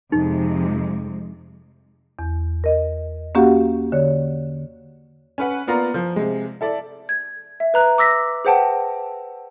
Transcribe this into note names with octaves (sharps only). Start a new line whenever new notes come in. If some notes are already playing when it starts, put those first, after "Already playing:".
F2 C3 G#3 D#4
E2
A#4 D#5
A#3 C#4 F#4 G4 F5 F#5
D3 C#5
C#4 B4 F#5
A#3 B3 F4 D5 A#5
F3
C3 G#3
E4 A4 D5
G#6
E5
B4 A#5 F#6
D6 E6 A#6 B6
G#4 B4 C5 F#5 G5 A5